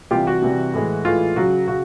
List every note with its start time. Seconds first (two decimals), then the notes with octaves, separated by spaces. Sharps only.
0.11 C3 E3 G3 F4 G4
0.27 F#4
0.42 C3 E3 G3
0.74 A2 E3 G#3
1.05 A2 E3 G#3 F4
1.36 C#3 F#3 F#4
1.68 C#3 F#4